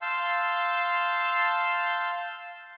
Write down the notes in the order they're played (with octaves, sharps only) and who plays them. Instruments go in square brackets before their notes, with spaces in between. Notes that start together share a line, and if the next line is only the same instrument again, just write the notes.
[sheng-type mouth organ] F5 A5 C6 E6 G6